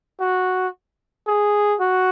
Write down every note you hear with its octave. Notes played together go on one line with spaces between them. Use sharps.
F#4
G#4
F#4